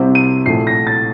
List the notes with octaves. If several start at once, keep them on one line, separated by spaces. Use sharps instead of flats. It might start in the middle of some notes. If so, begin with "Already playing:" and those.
Already playing: C2 C3 G3 C4
D#7
A#1 A2 A3 C7
A#6
A6